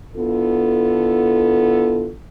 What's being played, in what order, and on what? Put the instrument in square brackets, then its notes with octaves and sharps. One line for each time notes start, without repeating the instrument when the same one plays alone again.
[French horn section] D3 B3 E4 F4 A4